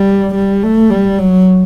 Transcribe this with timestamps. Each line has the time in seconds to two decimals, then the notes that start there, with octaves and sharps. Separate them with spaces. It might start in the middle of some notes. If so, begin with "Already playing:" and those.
Already playing: G3
0.35 G3
0.63 A3
0.90 G3
1.19 F#3